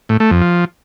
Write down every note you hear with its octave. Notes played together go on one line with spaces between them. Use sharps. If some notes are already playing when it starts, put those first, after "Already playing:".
A2
A3
F2
F3